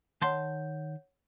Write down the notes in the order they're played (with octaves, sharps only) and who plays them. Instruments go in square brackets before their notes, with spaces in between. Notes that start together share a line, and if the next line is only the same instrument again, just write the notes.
[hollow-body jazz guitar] D#3 A5 C6 [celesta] C#5 F#5 G6